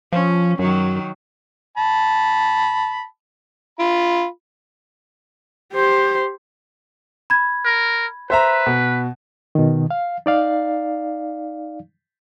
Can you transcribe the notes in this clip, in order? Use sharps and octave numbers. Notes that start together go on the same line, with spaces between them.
F3 C#4
F#2 D#3 F#3
A5 B5
F4 B5
G4 C5
B5 G#6
A#4
B4 C5 E5 A#5
B2
B2 D#3
F5
D#4 D5 F5